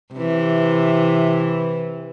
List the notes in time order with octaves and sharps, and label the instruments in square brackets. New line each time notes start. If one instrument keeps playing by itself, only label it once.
[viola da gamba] C3 E3